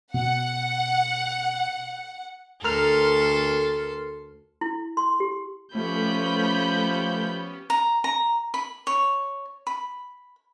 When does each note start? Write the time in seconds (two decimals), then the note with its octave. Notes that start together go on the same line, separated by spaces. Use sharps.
0.14 B2 F#5
2.64 D2 A4 A#4 C6 F6
4.61 E4
4.97 C6
5.20 G4
5.75 F3 A3 B3 C#4 G4 B5 G6
7.70 A#5
8.04 A#5
8.54 B5
8.87 C#5
9.67 B5